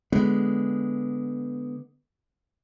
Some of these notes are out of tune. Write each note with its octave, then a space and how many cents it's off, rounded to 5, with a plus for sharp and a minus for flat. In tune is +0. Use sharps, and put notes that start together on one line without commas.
D3 +0 G#3 +0 B3 +0